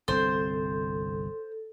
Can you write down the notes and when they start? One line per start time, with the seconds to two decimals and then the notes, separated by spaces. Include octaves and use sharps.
0.08 G1 C2 C4 A4 C5